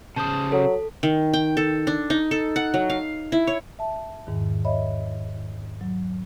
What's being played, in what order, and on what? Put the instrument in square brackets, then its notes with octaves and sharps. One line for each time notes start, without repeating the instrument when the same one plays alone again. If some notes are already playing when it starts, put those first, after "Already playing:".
[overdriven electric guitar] C#3 C5 [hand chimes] A5 D#6
[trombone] F#3 [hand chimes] A4
[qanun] D#3
G5
A4
D4
D#4
A4
F#5
F#3
F5
E4
C#5
[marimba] E5 A5
E2 G#2 D#3
C#5 D#5 E5 B5
F#3